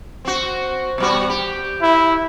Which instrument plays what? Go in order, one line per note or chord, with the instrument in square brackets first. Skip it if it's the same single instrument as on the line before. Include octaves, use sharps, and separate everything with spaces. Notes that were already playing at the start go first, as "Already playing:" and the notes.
[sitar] C4 F#4
B2 G3 F#4
G4
[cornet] E4